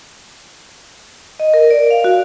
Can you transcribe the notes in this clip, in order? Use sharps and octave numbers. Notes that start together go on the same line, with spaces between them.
D#5
A#4
D5
F5
F#4